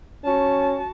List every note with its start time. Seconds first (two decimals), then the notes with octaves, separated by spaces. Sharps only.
0.24 C#4 F#4 A5